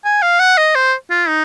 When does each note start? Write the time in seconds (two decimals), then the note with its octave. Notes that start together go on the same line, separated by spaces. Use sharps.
0.05 G#5
0.22 F5
0.40 F#5
0.58 D#5
0.75 C5
1.10 F4
1.29 D#4